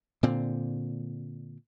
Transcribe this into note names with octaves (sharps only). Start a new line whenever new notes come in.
A#2 D3 C4